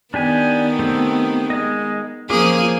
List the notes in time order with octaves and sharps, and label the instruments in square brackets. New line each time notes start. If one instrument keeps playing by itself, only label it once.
[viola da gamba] D#3 B3 [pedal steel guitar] D4 G4 G#5
[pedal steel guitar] A3 C4 G4
G#3 D#5
[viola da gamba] F3 A#3 G#4 [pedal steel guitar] C#4 F4 D6